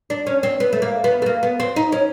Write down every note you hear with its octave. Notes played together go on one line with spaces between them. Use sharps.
D4
C#4
C4
B3
A3
A#3
B3
A3
A#3
B3
C4
D#4
C#4